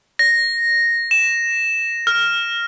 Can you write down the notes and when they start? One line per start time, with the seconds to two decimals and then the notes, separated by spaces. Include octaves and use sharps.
0.19 A#6
1.11 E7
2.07 F6